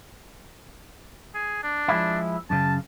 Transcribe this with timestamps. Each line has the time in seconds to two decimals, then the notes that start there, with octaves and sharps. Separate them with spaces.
1.35 G#4
1.63 D4
1.88 F3 G#3 E4
2.50 F#2 C#3 A5